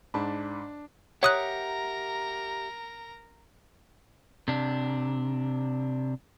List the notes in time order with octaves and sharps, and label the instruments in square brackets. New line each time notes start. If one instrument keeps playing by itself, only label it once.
[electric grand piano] G#2 B5 [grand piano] D4 A5
[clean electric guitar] G4 E5 F#5 [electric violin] A#4 A#5 [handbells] C#5 D#6 F#6
[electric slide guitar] C3 D4